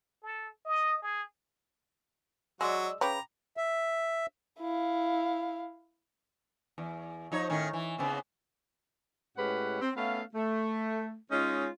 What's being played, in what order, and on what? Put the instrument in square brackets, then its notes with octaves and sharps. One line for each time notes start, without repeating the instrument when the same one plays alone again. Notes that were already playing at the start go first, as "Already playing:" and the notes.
[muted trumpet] A4
D#5
G#4
[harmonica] F#3 F#4 [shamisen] G#3 [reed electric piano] D5 D#5 E6
[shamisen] C#3 B4 C#5 [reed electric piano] G5 B5 D6 [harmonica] A#5
[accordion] E5
[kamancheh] E4 F5
[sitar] E2
F3 D#4 C#5
A2 D#3 C#4
E3
C#3 B3 C4
[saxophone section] A2 G#3 C#4 G4 B4 F#5
C4
A3 B3 C#4 F5
A3
G#3 C#4 D#4 F4 C#5 D#5